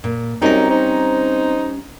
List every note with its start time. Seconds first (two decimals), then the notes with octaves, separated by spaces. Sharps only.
0.04 A#2
0.42 F#2 G3 C4 C#4 D#4 D5 A#5
0.70 D#4 C5